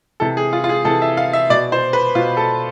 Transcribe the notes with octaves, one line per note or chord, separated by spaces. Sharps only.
C3 E3 A4
G#4
F4
F4
G#4
C3 E3 A4
E5
F5
E5
B2 D5
C5
B4
B2 F4
A4